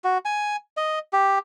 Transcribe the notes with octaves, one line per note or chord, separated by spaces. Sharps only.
F#4
G#5
D#5
G4